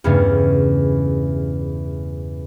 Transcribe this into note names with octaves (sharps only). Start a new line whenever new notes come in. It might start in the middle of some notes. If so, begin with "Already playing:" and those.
E2 G2 C#3 A3 C#4